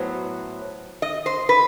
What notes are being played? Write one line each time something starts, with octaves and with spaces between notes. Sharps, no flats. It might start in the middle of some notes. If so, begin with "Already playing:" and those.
Already playing: A2 F#3 B3 C5
D#5
C5
B4